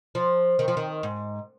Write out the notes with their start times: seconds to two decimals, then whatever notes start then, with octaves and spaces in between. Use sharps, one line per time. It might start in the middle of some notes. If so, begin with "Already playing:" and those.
0.15 F3
0.59 D#3
0.68 F3
0.77 D#3
1.03 G#2